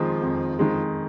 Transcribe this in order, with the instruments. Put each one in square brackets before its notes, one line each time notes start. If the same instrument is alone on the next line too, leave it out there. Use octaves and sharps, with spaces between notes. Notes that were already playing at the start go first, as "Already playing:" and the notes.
Already playing: [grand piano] F2 D#3 G#3 [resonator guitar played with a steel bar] F3
[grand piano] F2
D#3 G#3